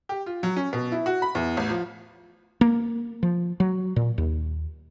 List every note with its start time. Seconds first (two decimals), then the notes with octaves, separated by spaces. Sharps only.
0.09 G4
0.26 F4
0.43 F#3
0.56 C#4
0.73 B2
0.92 E4
1.06 F#4
1.22 B5
1.35 E2
1.57 A1
1.70 F3
2.61 A#3
3.23 F3
3.60 F#3
3.96 A#2
4.18 D#2